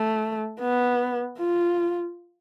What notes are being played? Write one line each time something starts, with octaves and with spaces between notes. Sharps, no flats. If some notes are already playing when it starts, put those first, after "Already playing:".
Already playing: A3
B3
F4